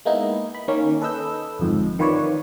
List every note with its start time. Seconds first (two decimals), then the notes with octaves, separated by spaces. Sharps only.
0.06 G#3 A#3 B3 D#4 E4
0.55 B5
0.68 D#3 A#3 C#4
1.01 A4 B4 D#5 E6 G6
1.59 G1 F2 G#2
1.99 D#3 F4 B4 C#5 D5